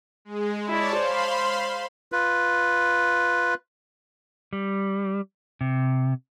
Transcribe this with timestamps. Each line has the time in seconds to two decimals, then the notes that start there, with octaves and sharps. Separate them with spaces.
0.25 G#3
0.68 E4 C#5 D5 A5
0.97 C5 F5 B5 C6
2.12 F4 B4
4.53 G3
5.61 C3